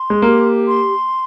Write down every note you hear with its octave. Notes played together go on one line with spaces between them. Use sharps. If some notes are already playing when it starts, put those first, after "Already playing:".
Already playing: C6
G#3
A#3 G4
C6